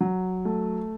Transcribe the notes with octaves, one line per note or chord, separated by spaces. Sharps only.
F#3
A3